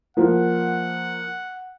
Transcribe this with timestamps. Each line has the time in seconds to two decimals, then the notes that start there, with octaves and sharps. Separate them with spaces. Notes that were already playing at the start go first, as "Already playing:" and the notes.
0.17 F3 A#3 F#5